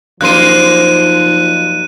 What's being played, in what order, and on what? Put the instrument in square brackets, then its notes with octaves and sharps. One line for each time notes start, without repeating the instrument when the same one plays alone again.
[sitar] F#2 A#3 C5 [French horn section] F3 D#4 [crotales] F#6 D#7